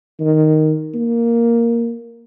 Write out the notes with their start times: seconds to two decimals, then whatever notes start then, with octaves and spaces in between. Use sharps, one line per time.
0.20 D#3
0.94 A#3